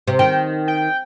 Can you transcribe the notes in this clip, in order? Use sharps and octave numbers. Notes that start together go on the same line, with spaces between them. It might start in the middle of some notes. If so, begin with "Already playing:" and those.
C3
D#3 G5
G5